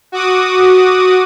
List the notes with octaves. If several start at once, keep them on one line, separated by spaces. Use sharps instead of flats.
F#4 D6 D#6